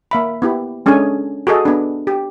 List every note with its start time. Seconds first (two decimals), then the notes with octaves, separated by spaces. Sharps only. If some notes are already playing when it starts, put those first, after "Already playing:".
0.11 A#3 E5 B5
0.42 B3 E4 G4
0.86 G#3 C#4 D4 G#4 A4 G#5
1.47 F#4 G#4 A4 D#5
1.65 B3 D4
2.07 G4